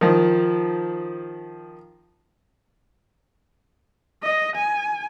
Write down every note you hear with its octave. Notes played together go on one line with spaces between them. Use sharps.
D#3 F3
D#5
G#5